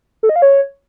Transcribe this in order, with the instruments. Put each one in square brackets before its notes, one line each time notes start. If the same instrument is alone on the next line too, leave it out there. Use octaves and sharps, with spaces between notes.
[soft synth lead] A4
D#5
F5
C#5